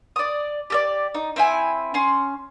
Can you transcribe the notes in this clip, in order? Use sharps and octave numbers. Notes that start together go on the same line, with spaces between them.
D5 D#6
G4 A4 D5
D#4
C4 E4 G#5
C#4 C6